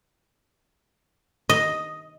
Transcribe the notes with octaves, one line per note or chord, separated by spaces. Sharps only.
D#5